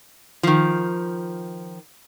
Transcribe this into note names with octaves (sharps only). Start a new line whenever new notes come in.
D#3 F3